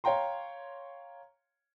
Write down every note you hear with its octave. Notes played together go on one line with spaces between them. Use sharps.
C#5 F5 G5 A#5 C6